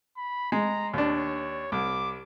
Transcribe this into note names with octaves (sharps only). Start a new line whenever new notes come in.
B5
G#3 A#5
D#2 D4 C#5
C2 D6